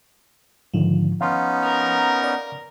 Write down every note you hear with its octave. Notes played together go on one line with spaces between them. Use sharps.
G#2 D3 D#3 F3
B3 C#4 D#4 F5 C6 F6
A#4
D5